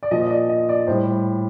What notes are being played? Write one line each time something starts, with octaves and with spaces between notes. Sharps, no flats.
D5
A#2 F3 D#5
D#5
D5
D#5
D5
A2 G3 C5